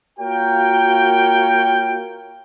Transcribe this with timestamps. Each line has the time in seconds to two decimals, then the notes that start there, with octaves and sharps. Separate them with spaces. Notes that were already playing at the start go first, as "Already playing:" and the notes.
0.19 A#3 F4 F#4 A#4 C#5 G5